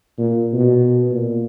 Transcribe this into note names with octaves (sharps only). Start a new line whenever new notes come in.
A#2
B2
A#2